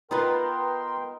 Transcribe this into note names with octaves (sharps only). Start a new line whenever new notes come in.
B3 D#4 F4 A#4 B4 G5 C6